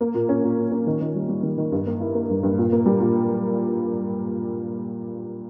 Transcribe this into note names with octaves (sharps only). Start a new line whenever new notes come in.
A#3
A#2
C#4
A#2
A#2
C#4
D#3
D#3
G3
G3
D#3
D#3
G2
A#3
E4
A#3
G2
G2
A#2
A#3
G3
A#2